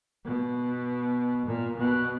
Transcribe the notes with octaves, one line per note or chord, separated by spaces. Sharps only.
B2
A#2
B2